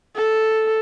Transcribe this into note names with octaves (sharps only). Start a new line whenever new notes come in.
A4